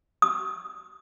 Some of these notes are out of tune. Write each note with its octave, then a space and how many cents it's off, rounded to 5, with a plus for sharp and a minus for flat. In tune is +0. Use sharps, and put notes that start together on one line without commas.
D#6 +10